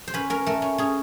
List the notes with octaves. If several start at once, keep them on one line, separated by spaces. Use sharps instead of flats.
C5
C#4 B4
C#4 A#4
A3 A#4
C#4
C#4 G#4